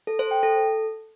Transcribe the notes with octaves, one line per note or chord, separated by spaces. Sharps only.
A4
C5
G5
A4